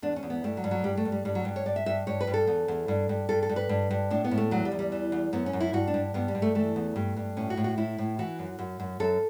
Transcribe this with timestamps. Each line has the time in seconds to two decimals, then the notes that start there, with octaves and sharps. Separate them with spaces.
0.02 E2 D4
0.16 C#4
0.23 E2
0.30 B3
0.44 G2 A3
0.57 F#3
0.64 G2
0.71 F#3
0.84 G2 G3
0.97 A3
1.05 G2
1.12 G3
1.25 G2 G3
1.35 F#3
1.45 G2
1.56 C#5
1.66 G2 D5
1.76 E5
1.86 G2 E5
2.07 G2 C#5
2.21 B4
2.27 G2
2.34 A4
2.47 E2
2.68 E2
2.88 G2
3.09 G2
3.29 G2 A4
3.43 A4
3.49 G2
3.56 B4
3.69 G2
3.91 G2
4.10 A2 D4
4.24 B3
4.31 A2
4.38 A3
4.51 E2 F#3
4.65 G3
4.72 E2
4.79 G3
4.92 E3
5.12 E2
5.33 F#2 B3
5.46 C#4
5.53 F#2
5.60 E4
5.73 G2 F#4
5.87 D4
5.94 G2
6.14 G2 B3
6.28 G3
6.35 G2
6.42 A3
6.55 E3 A3
6.76 E2
6.96 G2
7.17 G2
7.37 A2 C#4
7.50 F#4
7.57 A2
7.64 F#4
7.78 A2 E4
7.98 A2
8.19 E3 F#4
8.39 F#2
8.59 F#2
8.80 F#2
9.00 F#2 A4